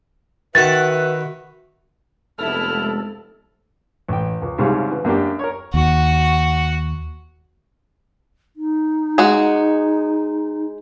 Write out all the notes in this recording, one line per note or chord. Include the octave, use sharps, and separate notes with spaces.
D#3 F#4 B4 E5 F#5 A6
F1 G#3 B3 E4 A4 F6
A1 G5
C#2
C2 G#2 C#3 G3 F5
E3
F#2 A#3 D4 G4
A#4 C#5
D#2 F#4 F#5
D#4
G#3 F#4